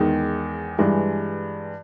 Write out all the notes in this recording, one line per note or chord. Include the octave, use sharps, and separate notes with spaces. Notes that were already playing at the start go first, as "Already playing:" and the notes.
Already playing: E2 D#3 G#3
G2 E3 G#3